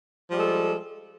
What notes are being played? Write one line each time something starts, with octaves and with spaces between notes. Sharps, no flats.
F3 G3 G#3 A4